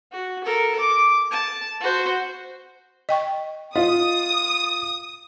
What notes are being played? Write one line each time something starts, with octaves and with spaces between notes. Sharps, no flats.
F#4
A4 A#4
D6
A5
F#4 C5
D#5 G5 C#6
F4 D#5 D#6